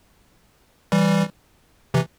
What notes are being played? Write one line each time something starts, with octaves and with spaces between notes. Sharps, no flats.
E3 G3
C3 E3